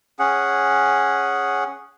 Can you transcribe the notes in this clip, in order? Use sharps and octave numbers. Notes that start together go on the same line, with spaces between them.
C#4 G#4 F#5